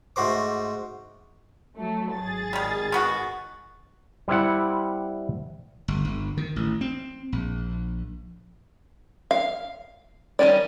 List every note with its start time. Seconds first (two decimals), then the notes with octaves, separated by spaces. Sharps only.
0.16 G#2 A3 F#4 C5 D6
1.77 F#3 A3
2.16 G#1 G#4 A6
2.53 D#3 G3
2.92 D#3 B3 F#4
4.28 G3 C4 E4 F#5
5.88 G1
6.05 G1
6.37 D#3
6.56 A1
6.81 C4
7.32 A#1
9.31 F5
10.39 D#3 G3 A#3 C#4 D5